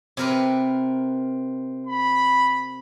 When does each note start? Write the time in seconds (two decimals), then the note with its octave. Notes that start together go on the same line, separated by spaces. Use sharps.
0.17 C3 A#4 B4
1.87 B5